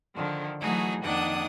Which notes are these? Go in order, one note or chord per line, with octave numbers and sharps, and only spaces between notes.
D3 D#3 F3
E3 F#3 A3 D#4 F#4 G#4
F2 D#3 A#3 D4 F#5 D#6